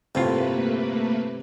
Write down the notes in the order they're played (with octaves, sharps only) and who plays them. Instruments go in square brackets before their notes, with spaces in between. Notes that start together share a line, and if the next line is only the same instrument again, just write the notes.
[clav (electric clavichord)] G1 A2 F4 [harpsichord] C3 [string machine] A3 A#3 B4